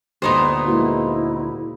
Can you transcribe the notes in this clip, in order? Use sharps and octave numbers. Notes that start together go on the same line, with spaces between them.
D2 A#2 B3 D#4 G4 C5
G#3 A#3 E4 F#4